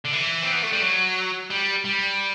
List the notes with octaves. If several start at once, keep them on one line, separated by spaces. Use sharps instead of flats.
D3
E3
C4
B3
A3
G3
F#3
G3
G3